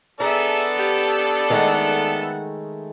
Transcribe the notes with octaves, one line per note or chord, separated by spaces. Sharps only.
B3 G#4 A4 D5 E5 A5 A#5
G4
D#3 G#3 A3 F#5